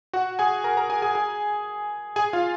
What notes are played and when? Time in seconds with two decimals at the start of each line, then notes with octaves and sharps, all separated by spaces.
0.13 F#4 F#5
0.39 G#4 G#5
0.64 A#4 A#5
0.77 A#4 A#5
0.89 G#4 G#5
1.02 G#4 G#5
1.15 G#4 G#5
2.16 G#4 G#5
2.33 F4 F5